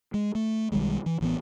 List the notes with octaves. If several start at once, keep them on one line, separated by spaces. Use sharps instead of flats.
G#3
A3
B1 D#3 G3 G#3
E3
A1 E3 G3 B3